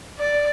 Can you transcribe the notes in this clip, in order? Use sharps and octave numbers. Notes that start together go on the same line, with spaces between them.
D5